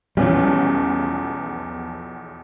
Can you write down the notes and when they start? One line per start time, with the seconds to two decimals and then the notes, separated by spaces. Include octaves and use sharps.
0.17 B1 E2 F3 G3 C#4